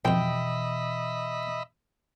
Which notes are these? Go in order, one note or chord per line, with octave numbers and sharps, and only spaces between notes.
F2 G#2 B2 E3 D#5 E5 G5 B5